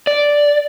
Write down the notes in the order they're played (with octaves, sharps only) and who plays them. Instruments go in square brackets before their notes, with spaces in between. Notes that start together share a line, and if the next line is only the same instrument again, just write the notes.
[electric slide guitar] D5